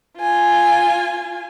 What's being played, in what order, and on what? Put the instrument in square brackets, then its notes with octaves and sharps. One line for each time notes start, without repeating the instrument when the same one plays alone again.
[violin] F4 G#5